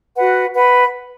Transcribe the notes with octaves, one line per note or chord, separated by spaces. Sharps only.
F#4 B4 F#5
B4 F#5 B5